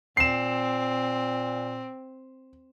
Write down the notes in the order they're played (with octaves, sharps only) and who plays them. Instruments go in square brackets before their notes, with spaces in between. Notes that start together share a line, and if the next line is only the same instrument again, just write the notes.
[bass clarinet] A#2 [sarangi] C4 [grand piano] C7 E7